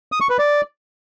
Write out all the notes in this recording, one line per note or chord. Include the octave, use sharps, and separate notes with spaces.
D#6
C#6
B4
D5